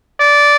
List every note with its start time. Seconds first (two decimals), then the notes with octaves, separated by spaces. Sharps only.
0.20 D5